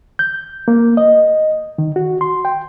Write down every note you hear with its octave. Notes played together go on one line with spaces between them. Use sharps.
G6
A#3
D#5
D#3
F#4
C6
G5